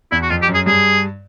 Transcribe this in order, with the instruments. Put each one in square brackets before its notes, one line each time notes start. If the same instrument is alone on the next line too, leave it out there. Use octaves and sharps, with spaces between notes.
[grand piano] E2 [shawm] E4
[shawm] F#4
[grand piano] F2 [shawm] F4
[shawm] G4
[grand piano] F#2
[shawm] G#4
[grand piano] G2 [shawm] G#4